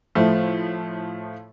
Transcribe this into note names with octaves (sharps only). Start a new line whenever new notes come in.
A2 F3 A3